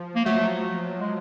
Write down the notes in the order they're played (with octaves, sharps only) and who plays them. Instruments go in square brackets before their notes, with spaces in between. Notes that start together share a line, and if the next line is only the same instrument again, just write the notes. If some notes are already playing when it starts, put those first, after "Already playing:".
Already playing: [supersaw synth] F3
[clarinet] A#3
[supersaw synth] F#3 [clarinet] A3
[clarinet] G#3